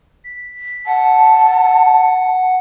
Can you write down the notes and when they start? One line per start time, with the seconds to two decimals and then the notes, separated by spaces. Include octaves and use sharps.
0.24 B6
0.86 F#5 A5